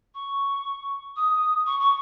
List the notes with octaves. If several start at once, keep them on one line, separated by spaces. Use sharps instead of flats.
C#6
D#6
C#6
C#6